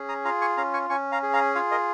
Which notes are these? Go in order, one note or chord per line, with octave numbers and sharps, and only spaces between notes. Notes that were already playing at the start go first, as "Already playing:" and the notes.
Already playing: C#4 G#4
A#5 D#6
F4 F5 A#5
G#5 C#6
C#4 F5 A#5
G#5 C#6
C#4 G#5 C#6
F5 A#5
G#4
F5 A#5
F4 C#5 F5
A#4 D#5